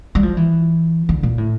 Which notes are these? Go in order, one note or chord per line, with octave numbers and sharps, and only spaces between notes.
G3
F3
E3
D3
A#2
A2